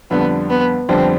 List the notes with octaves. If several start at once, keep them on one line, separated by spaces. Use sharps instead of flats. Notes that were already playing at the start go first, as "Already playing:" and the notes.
F2 D3 G3 B3
B3
F2 D3 G3 C4